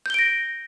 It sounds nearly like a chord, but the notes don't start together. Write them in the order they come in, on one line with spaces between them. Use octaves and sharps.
G6 G7 D7 A#6